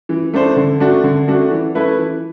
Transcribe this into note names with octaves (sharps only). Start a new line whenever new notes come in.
E3
A3 D4 A4 C5
D3
A3 D4 F#4
D3
A3 D4 F#4
E3
A3 E4 B4
E3